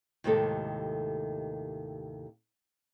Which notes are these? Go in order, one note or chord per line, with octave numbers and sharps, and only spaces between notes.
D#2 A2 C3 D#3 G#3 A4